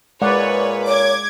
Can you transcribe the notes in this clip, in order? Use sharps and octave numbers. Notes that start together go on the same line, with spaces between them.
A#2 G#3 B4 C#5 D5 F#5
C#5 D6 G#6